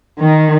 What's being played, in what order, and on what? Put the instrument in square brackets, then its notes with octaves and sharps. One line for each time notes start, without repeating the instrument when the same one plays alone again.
[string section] D#3